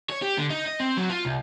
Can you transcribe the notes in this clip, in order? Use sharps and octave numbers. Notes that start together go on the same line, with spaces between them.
C#5
G4
D3
D#4
D#5
C4
F#3
F4
C2